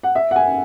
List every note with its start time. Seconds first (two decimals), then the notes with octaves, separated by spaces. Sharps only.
0.03 F#5
0.15 E5
0.31 F#5
0.36 G#5